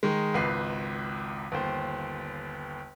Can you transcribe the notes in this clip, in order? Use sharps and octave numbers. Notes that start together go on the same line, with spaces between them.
D#3 G#3
G#1 C#2 B4 C7
G1 D#2 C5